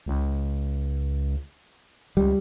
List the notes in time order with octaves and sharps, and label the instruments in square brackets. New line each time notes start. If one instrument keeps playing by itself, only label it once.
[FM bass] C#2
[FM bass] C#2 [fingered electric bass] G3